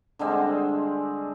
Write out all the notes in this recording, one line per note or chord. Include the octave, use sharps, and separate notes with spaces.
D3 G3 G#3 C4